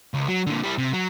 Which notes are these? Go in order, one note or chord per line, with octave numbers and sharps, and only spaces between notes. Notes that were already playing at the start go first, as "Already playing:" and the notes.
C#2
F#3
A#2 D3
G3 E4
C3
F#3